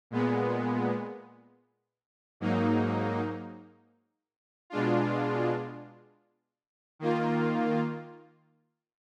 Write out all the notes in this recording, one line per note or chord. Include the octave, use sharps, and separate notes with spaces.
A#2 G#3 B3
G#2 F#3 A#3 D#4
B2 G#3 D4 F4
D#3 A#3 F4